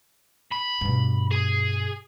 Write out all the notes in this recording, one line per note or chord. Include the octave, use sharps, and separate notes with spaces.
B5
G2 B2
G#4